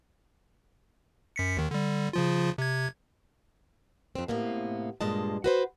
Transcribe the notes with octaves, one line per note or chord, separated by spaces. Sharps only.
F#2 B6 C#7
D#2 D#3
D3 G3
C#3 F3 F4
C3 G#6
F2 C4
A2 C3 A#3 B3
G2 A#2 G#3 D#5 A5
F#4 B4 C5